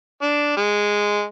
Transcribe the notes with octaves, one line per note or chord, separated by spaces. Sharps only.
D4
G#3